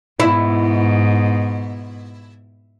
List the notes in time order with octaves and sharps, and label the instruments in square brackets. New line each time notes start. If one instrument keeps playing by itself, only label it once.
[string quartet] G#2 B2 [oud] E4